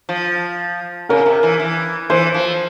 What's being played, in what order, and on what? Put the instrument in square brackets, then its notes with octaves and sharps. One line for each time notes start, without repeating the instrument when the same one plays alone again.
[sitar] F3
[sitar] C#3 [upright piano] A#4
[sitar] C3
E3
E3
[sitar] E3 [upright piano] C5
[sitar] F3